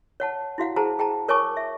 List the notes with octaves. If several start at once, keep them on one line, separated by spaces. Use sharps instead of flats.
C#5 F#5 A5
E4 F#4 F5 F#5
G#4 C5 F#5 A5 A#5
G#4 G5 A5 A#5
A#4 C#5 G#5 A5 C#6 D6
E5